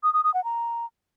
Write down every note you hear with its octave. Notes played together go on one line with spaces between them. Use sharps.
D#6
D#6
D#6
F#5
A#5